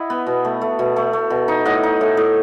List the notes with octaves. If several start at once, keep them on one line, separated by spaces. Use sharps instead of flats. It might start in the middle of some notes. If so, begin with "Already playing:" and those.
Already playing: E4 D#5 F#5
B3
B2
A3
A3
B2
A3
A3
B2
D#4
A2 D#5 F#5
D#4
A2
A2